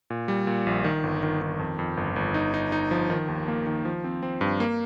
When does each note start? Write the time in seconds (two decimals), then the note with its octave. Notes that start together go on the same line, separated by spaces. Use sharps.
0.10 A#2
0.28 G3
0.47 A#2
0.67 A#1
0.84 D#3
1.03 G1
1.23 D#3
1.42 D#3
1.59 F2
1.79 F2
1.97 G1
2.16 G1
2.34 D#4
2.54 D#4
2.72 D#4
2.91 F3
3.10 D#3
3.28 D#2
3.48 A#3
3.67 D#3
3.85 F3
4.04 C4
4.23 C4
4.41 G2
4.60 A#3